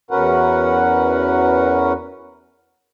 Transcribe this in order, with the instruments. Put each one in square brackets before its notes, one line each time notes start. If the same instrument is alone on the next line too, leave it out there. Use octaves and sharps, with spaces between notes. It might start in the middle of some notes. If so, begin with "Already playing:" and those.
[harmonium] E2 C#4 F#4 A#4 B4 F#5